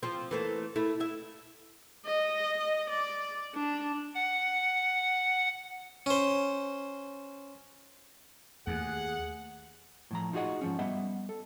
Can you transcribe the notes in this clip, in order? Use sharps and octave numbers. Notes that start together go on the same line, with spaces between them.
F3 C4
E3 A3 A#3
A3 E4
E4 E5
D#5
D5
D4
F#5
C#4 C5
D#2 A3 G#4 F#5 F#6
A2 F3 A#5
D#4 F4 F#4 G#4 D#5 F#5
G#2 F3 C#4
G3 B3 D#5 E5 F#5
A4